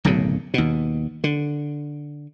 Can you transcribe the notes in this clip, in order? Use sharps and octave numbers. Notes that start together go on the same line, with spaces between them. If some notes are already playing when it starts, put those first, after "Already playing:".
D1 B1 F#2 C#3
D#2 B2
D3